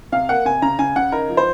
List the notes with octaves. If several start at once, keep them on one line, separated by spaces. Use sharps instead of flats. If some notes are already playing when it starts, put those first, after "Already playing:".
C3 F5
A#3 F#5
C3 G#5
C#3 A#5
C#3 G#5
C#3 F#5
D#4 A#4
F3
C5